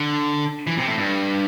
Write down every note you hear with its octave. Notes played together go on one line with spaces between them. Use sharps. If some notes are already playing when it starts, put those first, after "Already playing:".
Already playing: D3
E3
C3
A2
G2